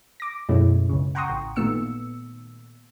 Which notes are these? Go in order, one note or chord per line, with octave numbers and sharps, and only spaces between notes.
D6 A#6
F#2 B2 G#3 A3 C#4 E4
C#2 C#3
F#5 G5 A#5 C6 C#6 D#6
A1
A#2 D#3 A3 B3 E6 C#7